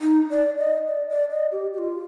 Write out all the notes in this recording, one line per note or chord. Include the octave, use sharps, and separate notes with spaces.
D#4
D5
D#5
D5
D5
D#5
G4
G4
F4